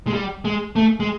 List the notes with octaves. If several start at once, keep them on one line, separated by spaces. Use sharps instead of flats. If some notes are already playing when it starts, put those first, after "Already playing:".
G#3
G3
G#3
A3
G#3